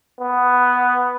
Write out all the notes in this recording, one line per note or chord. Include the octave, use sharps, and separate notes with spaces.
B3